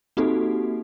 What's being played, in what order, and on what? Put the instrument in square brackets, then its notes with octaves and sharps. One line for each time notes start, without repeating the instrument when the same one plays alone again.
[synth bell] A#3 C4 D#4 F#4 G4 A4